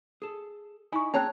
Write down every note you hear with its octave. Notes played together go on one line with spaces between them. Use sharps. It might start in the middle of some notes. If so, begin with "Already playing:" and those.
G#4 A4
D#4 E4 G#5 B5 C#6
A#3 C4 C#4 G#4 C#5 A5 A#5 F#6